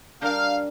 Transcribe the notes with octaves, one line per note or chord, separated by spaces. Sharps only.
G3 D4 G4 A#4 F5